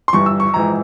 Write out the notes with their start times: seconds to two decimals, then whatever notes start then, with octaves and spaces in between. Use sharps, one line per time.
0.08 C6
0.13 G1 G2 E3 C#6
0.26 E6
0.40 C#6
0.54 A#1 G#2 E3 A#5